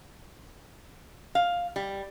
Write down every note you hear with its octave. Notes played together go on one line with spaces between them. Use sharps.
F5
G3